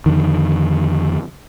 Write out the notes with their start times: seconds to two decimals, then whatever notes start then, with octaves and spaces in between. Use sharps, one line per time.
0.06 F2 D3 D#3